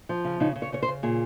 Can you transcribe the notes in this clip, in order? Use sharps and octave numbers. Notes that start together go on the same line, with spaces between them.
F3
C#3
C#3 D#4
C#3
C#5
C#3 C#5
C5
C#3
A#2 G#4